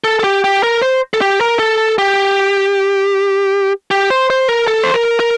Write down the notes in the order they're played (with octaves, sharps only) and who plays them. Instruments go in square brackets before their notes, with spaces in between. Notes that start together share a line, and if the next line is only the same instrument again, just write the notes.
[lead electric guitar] A4
A4
G4
G4
A#4
C5
A4
G4
A#4
A4
G4
G4
C5
C5
A#4
A4
C5
A#4
A#4